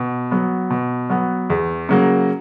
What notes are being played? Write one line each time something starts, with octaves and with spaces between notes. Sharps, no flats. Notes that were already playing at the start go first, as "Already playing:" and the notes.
Already playing: B2
F#3 B3
B2
F#3 B3
E2
C#3 F#3 A#3